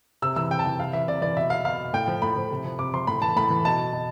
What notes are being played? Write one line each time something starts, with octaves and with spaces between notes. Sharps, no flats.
C3 E6
E3 E6
C3 G5
A5
E3 G5
C3 F5
E3 E5
C3 D5
E3 D5
B2 E5
F5
B2 F5
A2 G5
F3
A2 B5
F3
C3
F3
C3 D6
F3 C6
A2 B5
E3 A5
A2 B5
E3
B2 A5
B2